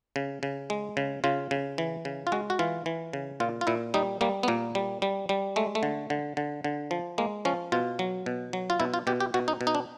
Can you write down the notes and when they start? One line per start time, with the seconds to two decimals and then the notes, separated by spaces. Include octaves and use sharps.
0.16 C#3
0.43 C#3
0.70 G#3
0.97 C#3
1.24 C#3 F4
1.51 C#3
1.78 E3
2.05 C#3
2.27 F4
2.32 G#3 F#4
2.50 F#4
2.59 E3 F4
2.86 E3
3.13 C#3
3.40 A#2 F4
3.61 F4
3.67 A#2 E4
3.94 G3 D#4
4.21 G3 A#3
4.43 B3
4.48 A#2 A#3
4.75 G3
5.02 G3
5.29 G3
5.56 G#3 A3
5.75 A3
5.83 D3
6.10 D3
6.37 D3
6.64 D3
6.91 F3
7.18 G#3 A#3
7.45 F3 C#4
7.72 B2 F4
7.99 F#3
8.26 B2
8.53 F#3
8.70 F4
8.80 B2 E4
8.94 F4
9.07 B2 G4
9.20 G4
9.34 B2 F#4
9.48 D#4
9.61 B2
9.67 D#4
9.75 D4